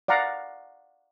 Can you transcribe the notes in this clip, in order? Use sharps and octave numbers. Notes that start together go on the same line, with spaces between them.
D5 F5 F#5 A#5